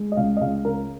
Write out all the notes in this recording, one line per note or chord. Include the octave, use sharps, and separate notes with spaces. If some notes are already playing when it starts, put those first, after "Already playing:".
Already playing: G#3
D#5
C#2 F5
D#5
C#2 F5
C#3 A#4